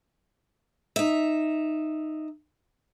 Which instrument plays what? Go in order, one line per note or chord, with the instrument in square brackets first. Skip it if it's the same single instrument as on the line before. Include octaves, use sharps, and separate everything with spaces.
[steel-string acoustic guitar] D#4 E5